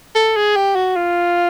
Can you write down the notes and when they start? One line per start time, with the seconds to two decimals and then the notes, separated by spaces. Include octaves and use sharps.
0.16 A4
0.36 G#4
0.56 G4
0.75 F#4
0.96 F4